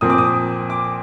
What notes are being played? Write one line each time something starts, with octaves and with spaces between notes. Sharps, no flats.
A#2 F3 C4 D#6
D6
D#6
D6